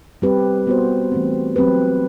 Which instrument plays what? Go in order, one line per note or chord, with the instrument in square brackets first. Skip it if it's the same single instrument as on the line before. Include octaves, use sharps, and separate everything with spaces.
[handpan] G3 C4 G4 B4
B3 F#4 C5
E3 A3 C4
F#3 C4 G4 B4